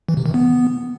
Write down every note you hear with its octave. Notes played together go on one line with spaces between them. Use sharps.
E3
C3
D#3
B3